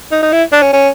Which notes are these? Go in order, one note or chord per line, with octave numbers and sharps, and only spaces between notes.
D#4
D#4
E4
D4
C#4
C#4